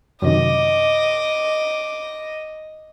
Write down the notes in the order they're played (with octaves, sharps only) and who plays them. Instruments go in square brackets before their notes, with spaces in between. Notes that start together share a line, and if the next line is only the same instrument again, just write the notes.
[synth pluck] F#2 C3 D#3 [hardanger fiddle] D#5 [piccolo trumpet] D6